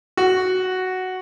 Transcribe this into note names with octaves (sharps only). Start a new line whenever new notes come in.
F#4